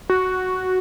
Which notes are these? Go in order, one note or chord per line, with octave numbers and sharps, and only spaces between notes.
F#4